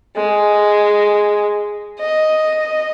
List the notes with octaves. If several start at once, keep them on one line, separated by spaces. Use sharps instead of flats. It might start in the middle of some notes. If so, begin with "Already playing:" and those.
G#3
D#5